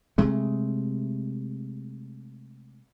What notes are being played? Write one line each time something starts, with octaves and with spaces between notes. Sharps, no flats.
C3 G#3 A3